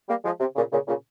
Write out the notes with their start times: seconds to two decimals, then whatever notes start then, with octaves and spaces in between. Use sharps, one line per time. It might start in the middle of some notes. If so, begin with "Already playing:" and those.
0.08 G3 A#3
0.25 F3 G#3
0.40 C3
0.56 A#2 C#3
0.72 A#2 C#3
0.88 A#2 C#3